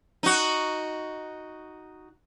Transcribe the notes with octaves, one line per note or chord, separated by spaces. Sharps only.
D#4 F#4